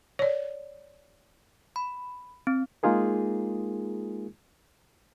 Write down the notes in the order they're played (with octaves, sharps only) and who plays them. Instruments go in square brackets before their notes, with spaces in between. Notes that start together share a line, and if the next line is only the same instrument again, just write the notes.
[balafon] C#5 D5
[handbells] B5
C4
[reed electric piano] G#3 A#3 D#4 F4 G#4 A#4